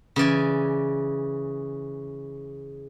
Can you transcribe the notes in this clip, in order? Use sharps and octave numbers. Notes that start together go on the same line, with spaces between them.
C#3 E3 D5 G#5